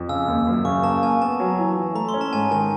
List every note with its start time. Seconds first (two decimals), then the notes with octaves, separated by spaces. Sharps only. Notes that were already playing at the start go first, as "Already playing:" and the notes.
Already playing: F2
0.09 C#3 E6
0.28 D#2
0.47 F#2
0.65 C#3 C#6
0.83 A#3 A5
1.03 A#3 G#5
1.22 B3 A5
1.40 F#3
1.59 E3
1.78 E3
1.95 A3 A#5
2.09 C6
2.14 C#4
2.21 A5
2.33 G#2 G#5
2.51 D#3 G#5